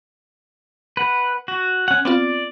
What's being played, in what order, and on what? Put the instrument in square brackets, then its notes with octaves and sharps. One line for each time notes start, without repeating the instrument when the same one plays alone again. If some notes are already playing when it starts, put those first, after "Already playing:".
[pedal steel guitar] B4 F#5
F#4
C#4 F#5
[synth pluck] B3 C4 F4 [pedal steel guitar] D5